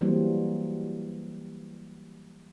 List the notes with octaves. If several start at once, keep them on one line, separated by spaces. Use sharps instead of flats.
E3 F#3 G3 A#3 C4